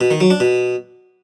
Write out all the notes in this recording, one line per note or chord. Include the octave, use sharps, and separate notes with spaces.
B2
D#3
F#3
D4
B2